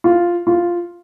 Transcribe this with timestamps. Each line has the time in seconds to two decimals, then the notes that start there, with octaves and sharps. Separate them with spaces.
0.04 F4
0.47 F4